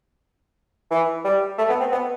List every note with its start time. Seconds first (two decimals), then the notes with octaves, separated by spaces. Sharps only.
0.91 E3
1.25 G3
1.58 A3
1.69 B3
1.80 C4
1.92 B3